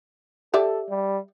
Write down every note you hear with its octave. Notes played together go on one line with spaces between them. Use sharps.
G4 A4 D5 E5
G3